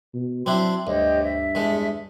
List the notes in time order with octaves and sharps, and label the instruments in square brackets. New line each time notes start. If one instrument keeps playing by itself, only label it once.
[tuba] B2
[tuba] F#3 [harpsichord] C4 D4 E4 [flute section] C6
[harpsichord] D2 [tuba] G2 [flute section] G4 C#5 D#5
[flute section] E5
[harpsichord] E2 G#3 A4